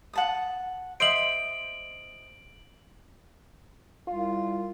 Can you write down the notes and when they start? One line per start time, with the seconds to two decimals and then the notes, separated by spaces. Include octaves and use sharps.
0.13 F#5 A5 D#6
1.00 C5 D#5 E5 D7 F#7
4.08 C2 F4